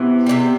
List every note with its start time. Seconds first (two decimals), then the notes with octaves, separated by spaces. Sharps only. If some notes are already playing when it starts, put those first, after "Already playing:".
Already playing: C3 E3 B3
0.26 C3 E3 G3